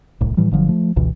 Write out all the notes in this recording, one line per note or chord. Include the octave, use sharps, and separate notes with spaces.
D1 C2 A2
A2 E3 F3 G3
G1 D3 F3 F#3
F3 A3
G1 C#2 B2 E3